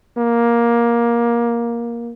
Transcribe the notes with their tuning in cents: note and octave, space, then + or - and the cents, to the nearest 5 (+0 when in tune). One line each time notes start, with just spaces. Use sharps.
A#3 +15